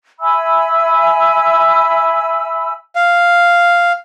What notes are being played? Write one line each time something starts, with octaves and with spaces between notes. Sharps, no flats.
E5 G#5 B5 E6
F5